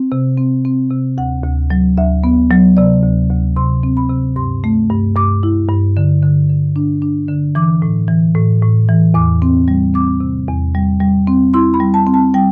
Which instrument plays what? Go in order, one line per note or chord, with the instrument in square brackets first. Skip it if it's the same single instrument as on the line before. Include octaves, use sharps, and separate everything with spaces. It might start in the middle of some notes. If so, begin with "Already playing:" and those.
Already playing: [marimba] C4
C3
C4
C4
C3
D2 F#5
D2
F#3
D2 E5
B3
F#3
C3 D5
D2
D2
C3 C6
C4
B5
C3
G2 C6
A3
G2
G2 D6
E4
G2
D3
D3
D3
D4
D4
D3
E3 D6
A2
E3
A2
A2
E3
E2 D6
C4
G3
C4 D6
C3
E2
G3
G3
C4
E4 C6
B5
G3
A5
C4
A5
G3 G5